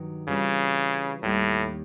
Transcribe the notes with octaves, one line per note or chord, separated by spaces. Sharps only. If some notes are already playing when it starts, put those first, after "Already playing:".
Already playing: G2 D#3 F#3
C#3 E3 G3 C4 F4
D#2 A2 D#3 G3